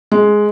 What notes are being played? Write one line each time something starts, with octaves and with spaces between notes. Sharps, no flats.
G#3